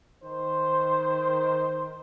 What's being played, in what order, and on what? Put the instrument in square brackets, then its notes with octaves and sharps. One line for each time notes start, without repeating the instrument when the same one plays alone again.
[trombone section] D#3 C5